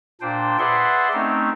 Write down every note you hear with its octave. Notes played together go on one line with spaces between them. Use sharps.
A#2 D4 C5 G5
G#4 B4 D5 E5 F#5 C6
A3 C4 C#4 D#4